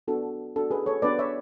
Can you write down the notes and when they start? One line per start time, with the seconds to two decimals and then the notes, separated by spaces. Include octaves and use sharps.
0.08 B3 D4 F#4 A4
0.56 B3 D4 F#4 A4
0.71 G#4 B4
0.86 A4 C#5
1.02 B3 D4 F#4 B4 D5
1.19 C#5 E5